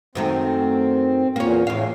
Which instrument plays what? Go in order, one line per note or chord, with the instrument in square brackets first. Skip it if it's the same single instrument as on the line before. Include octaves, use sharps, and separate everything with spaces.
[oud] F#2 D#3 A3 [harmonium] C4
[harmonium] E2 A#2 [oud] A#3 C#4
[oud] E2 F5 [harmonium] A2